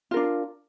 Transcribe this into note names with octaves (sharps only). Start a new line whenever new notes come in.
D4 F4 A#4